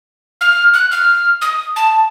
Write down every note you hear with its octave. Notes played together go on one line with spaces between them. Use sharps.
F6
F#6
F6
D#6
A5